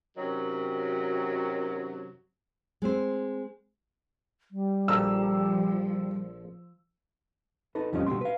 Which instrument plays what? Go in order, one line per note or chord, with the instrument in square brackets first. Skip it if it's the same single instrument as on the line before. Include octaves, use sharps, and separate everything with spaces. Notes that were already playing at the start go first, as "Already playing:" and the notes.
[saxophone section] F#2 C3 D#3 F#3
[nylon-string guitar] G#3 C4 C5
[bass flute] G3
[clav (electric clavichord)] A#1 A4 A#5 [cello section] F3 [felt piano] E6
[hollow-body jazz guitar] D#4 A4 B4
F2 F3 G3 C#4 D#5
B2 D3 G3 A#3 C6
B4 F5